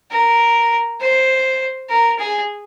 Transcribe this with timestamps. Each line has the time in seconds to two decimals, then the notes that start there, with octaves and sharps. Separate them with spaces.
0.11 A#4
1.00 C5
1.90 A#4
2.19 G#4